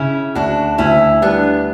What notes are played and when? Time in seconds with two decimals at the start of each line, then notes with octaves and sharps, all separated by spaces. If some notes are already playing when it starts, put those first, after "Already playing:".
Already playing: C#3 C#4 E4
0.35 D2 D4 F#4
0.78 D2 C#4 E4
1.22 G3 B3 D4